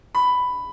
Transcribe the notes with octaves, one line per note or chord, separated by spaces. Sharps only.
B5